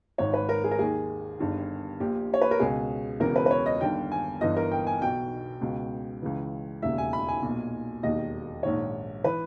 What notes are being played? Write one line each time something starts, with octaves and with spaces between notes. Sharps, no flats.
G#1 G#2 D#3 C#5
B4
A#4
G#4
A#4
D#2 D#3 G#4
G1 G2 D#3
A#1 A#2 G4
C#5
B4
A#4
C#2 B2 G#4
E1 E2 C#3 E3 A#4
B4
B4
C#5
D#5
G1 G2 D#3 G5
G#5
G1 G2 E3 D#5
A#4
G5
G#5
B1 B2 G5
C#2 B2
C#2 C#3 E3
E1 D#2 C#3 E5
G#5
B5
G#5
B1 A#2
E1 D#2 D#3 D#5
A#1 G#2 D#3 C#5
E3 B4